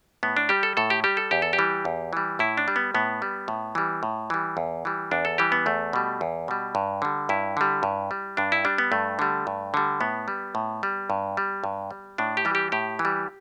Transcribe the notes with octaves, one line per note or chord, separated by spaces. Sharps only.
A2 B3
D4
G3 G4
A4
A2 A4
G4
G3 G4
A4
E2 G4
A4
G4
E3 G3
E2
E3 G3
A2 E4
D4
G3
B3
A2 B3
G3
A2
E3 G3
A2
E3 G3
E2
E3 G3
E2 D4
A4
E3 G3 G4
B3
E2 A3
B2 G3
E2
B2 G3
G2
D3 G3
G2 E4
D3 G3
G2
G3
G2 D4
E4
G3 D4
B3
G2 A3
D3 G3
G2
D3 G3
A2 B3
G3
A2
G3
G2
G3
G2
G3
A2 D4
G4
E3 G3
G4
A2 G4
E3
G3